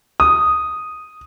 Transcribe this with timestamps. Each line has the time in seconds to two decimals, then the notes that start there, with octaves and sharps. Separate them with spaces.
0.20 D#6